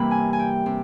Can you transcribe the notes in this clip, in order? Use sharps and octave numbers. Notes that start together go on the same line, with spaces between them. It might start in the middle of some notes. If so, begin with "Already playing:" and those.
Already playing: C3 E3 G3 A#3 B5
G#5
G#5
G5
C3